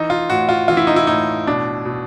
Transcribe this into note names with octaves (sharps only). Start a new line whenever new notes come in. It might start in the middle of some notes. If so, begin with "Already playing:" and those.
Already playing: E3 D#4
F4
A2 F#4
F4
E3 F4
E4
D#4
E4
A2 D#4
B2 D4
B2